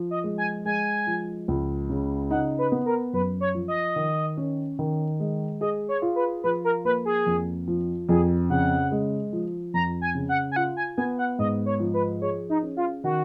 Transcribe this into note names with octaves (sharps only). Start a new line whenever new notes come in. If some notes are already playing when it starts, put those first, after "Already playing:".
Already playing: F3
D#5
G#3
G#5
G#3 G#5
F3
C#2
C#3
D#4 F#5
B4
B3
A#4
F#2 B4
C#5
F3
D#5
D#3
C#4
D#3
G#3
G#4 D#5
C#5
F4
B4
F3 B4
A#4
A#3 B4
G#4
F2
F3
F2 G#4
C#3 F#5
G#3
F3
F2 A#5
G#5
C#3
F#5
G#5
F4 F#5
G#5
B3 G#5
F#5
G#2 D#5
C#5
F3
B4
G#4 C#5
D#4
C#4
F4
D#3 F#4